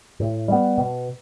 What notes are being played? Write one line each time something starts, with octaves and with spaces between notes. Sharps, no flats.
A2
G3 B3
B2